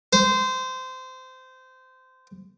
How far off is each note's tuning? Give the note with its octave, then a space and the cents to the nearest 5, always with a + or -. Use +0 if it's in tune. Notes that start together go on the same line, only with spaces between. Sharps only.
C5 -20